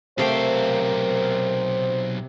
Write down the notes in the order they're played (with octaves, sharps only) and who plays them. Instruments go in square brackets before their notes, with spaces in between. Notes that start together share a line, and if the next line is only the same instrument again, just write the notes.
[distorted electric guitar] B1 F5 [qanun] C3 A3 G5 [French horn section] A#4 [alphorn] C5